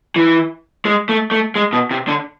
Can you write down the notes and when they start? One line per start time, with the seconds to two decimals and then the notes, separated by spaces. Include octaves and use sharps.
0.16 E3
0.85 G#3
1.09 A3
1.31 A3
1.56 G#3
1.73 B2
1.91 C3
2.08 D3